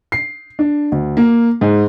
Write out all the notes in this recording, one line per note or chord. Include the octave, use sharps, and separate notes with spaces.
C7
D4
D2
A#3
G#2